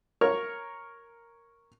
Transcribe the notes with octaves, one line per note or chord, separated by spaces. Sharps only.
A#4 C#5 C#6